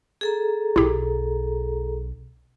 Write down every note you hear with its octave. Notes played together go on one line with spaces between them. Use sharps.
G#4 A4 A#5
B1 E4 G4